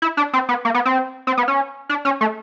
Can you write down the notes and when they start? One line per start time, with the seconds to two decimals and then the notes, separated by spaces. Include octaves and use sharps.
0.02 E4
0.17 D4
0.33 C4
0.49 B3
0.65 A#3
0.74 B3
0.85 C4
1.27 C4
1.37 B3
1.48 C#4
1.89 D4
2.05 C#4
2.21 A3